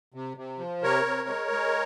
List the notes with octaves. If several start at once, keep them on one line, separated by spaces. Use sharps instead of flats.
C3
C3
F3
C3 A#4 C#5
C3
G#3
G#3